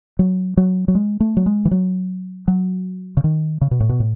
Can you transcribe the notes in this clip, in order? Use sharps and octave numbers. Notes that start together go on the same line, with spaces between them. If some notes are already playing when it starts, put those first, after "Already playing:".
F#3
F#3
F#3
G#3
A3
F#3
G#3
E3
F#3
F#3
C#3
D#3
C#3
B2
A2
B2
A2